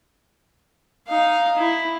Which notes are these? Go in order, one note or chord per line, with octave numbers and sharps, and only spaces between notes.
D#4 F5
E4